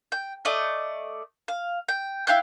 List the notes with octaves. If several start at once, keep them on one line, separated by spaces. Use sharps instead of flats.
G5
A3 D5 D#5
F5
G5
E4 F5 G5 F#6